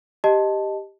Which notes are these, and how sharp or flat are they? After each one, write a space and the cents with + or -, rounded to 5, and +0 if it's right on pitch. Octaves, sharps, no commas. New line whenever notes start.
G4 +0 D#5 +0 A5 +0